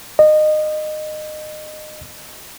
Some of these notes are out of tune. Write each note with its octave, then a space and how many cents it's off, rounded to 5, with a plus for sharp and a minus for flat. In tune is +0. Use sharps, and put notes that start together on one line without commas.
D#5 -25